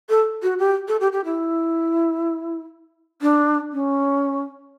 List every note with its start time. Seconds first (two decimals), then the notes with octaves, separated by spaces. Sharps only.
0.09 A4
0.43 F#4
0.59 G4
0.88 A4
1.00 G4
1.12 G4
1.25 E4
3.22 D4
3.72 C#4